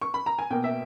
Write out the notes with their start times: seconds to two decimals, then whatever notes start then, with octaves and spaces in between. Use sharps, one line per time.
0.01 C#6
0.14 B5
0.26 A#5
0.39 G#5
0.51 B2 A#3 G5
0.64 E5